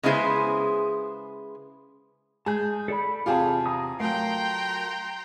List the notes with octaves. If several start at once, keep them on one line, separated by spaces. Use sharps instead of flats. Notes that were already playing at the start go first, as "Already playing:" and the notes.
C#3 G#3 B3 E4 G#4 C5
G#3 G#4 A5 G6
A4 D5 B5
E2 C3 F4 G4 G#4 A5
G#5 A#5 D#6
F#3 A3 A#4 F5 G5 A#5 C6